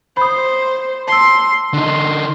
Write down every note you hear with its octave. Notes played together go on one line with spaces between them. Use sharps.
C5 B5 D#6
A5 C6 E6
D3 D#4 C6